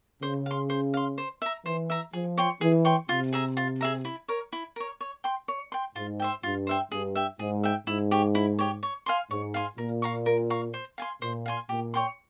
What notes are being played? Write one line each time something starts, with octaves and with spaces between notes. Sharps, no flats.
C#3 C5
F5 C6
C5
F5 C6
C5
E5 A#5
E3 C5
E5 A#5
F3 G#4
C#5 G5 C6
E3 G#4
C#5 G5 C6
C3 F4
G#4 E5 A#5
F4
G#4 E5 A#5
E4
A#4 C#5
E4
A#4 C#5
C#5
G5 C6
C#5
G5 C6
G#2 F4
C5 E5 G5
G2 F4
C5 E5 G5
G2 G#4
E5 G5
G#2 G#4
E5 G5
G#2 E4
G4 C#5
E4
G4 C#5
C#5
F5 G#5 C6
G#2 C#5
F5 G#5 C6
A#2 A#4
F5 A#5 C#6
A#4
F5 A#5 C#6
C5
F5 G#5 C6
A#2 C5
F5 G#5 C6
A#2 G4
C#5 G5 C6